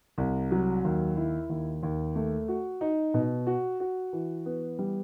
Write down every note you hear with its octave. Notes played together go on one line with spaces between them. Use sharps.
C2
F#3
D#2
E4
D#2
D#2
A3
F#4
D#4
B2
F#4
F#4
E3
B3
G3